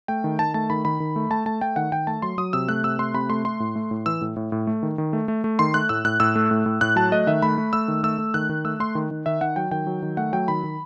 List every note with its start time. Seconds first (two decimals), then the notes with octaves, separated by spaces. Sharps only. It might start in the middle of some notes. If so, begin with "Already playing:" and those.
0.08 A3 G5
0.24 D#3
0.39 D#3 A5
0.54 A3 A5
0.70 D#3 B5
0.85 D#3 B5
1.00 D#3
1.16 A3
1.30 A3 A5
1.46 A3 A5
1.61 A3 G5
1.76 D#3 F#5
1.92 D#3 G5
2.07 A3 A5
2.22 F#3 C6
2.38 F#3 D#6
2.53 C3 E6
2.68 A3 F#6
2.84 C3 E6
2.99 A3 C6
3.14 C3 B5
3.29 A3 C6
3.45 A3 C6
3.60 A2
3.76 A3
3.91 A2
4.06 E3 E6
4.21 A2
4.36 A2
4.52 A2
4.67 A3
4.83 D#3
4.98 D#3
5.13 A3
5.28 A3
5.44 A3
5.59 D#3 C6
5.74 A3 F#6
5.89 A2 E6
6.05 A2 F#6
6.20 A2 E6
6.36 A3
6.51 A2
6.66 A2
6.81 A2 F#6
6.96 F#3 A5
7.12 A3 D#5
7.27 D#3 E5
7.42 A3 B5
7.58 A3
7.73 A3 E6
7.88 D#3
8.03 A3 E6
8.18 A3
8.34 D#3 F#6
8.49 D#3
8.65 A3 E6
8.80 A3 C6
8.95 D#3
9.11 D#3
9.26 D#3 E5
9.41 D#3 F#5
9.56 F#3 G5
9.71 D#3 G5
9.87 F#3
10.02 D#3
10.17 A3 F#5
10.33 F#3 G5
10.48 D#3 B5
10.64 D#3